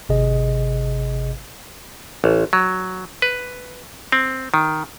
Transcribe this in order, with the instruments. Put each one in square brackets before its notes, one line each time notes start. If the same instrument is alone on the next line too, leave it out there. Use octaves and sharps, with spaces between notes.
[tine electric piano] G#1 C3 G#4 D#5
[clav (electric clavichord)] A1
F#3
B4
C4
D#3